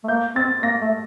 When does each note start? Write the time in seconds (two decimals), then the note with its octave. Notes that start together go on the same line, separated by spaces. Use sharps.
0.04 A3
0.08 A#3 G6
0.35 C4 A6
0.63 A#3 A#6
0.81 A3